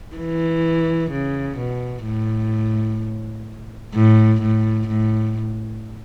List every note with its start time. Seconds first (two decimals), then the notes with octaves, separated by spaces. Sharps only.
0.16 E3
1.11 C#3
1.57 B2
2.05 A2
3.94 A2
4.41 A2
4.88 A2